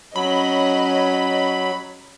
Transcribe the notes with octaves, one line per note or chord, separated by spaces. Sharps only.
F#3 C#4 D#5 B5